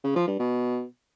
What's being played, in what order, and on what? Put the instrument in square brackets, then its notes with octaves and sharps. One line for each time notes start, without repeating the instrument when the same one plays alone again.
[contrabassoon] C#3
F3
G2
B2